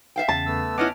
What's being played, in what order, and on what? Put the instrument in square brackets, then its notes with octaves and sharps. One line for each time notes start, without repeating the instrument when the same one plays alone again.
[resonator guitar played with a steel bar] E5 F5 G5
[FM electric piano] E2 C#3 [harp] A5
[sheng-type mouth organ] A3 B3 E6
[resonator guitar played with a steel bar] B3 C#4 E4 [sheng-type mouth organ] D#5 F#5 G#5 [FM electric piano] D6 F6